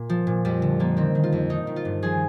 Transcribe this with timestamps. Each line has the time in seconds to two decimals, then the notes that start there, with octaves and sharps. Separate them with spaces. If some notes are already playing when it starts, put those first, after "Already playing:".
Already playing: A#2 A#3
0.10 F3
0.27 A#2
0.45 F2 G3
0.62 D3
0.80 F3 A#3
0.97 D#3 C4
1.15 D#3
1.24 F4
1.32 F2
1.50 D#3 D#4
1.67 D#3
1.76 F4
1.85 G2
2.02 F3 G#4